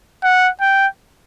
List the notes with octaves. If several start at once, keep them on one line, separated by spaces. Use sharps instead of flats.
F#5
G5